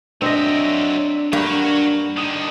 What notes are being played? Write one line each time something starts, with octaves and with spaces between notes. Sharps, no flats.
F#3 C4 D4 D#5 E5
G2 A#3 F#4 G4 C#5 G5
D3 D#3 D#6